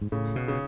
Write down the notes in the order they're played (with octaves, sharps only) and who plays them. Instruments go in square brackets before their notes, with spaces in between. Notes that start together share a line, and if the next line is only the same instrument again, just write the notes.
[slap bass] G#2
[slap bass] A2 [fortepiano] C#3
[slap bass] B2
[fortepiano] C#3